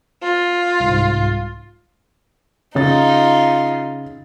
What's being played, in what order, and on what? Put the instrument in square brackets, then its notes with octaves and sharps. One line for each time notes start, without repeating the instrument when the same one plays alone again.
[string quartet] F4
[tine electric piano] C2 G#2
[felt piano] C#3 A6 [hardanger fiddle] D#4 F4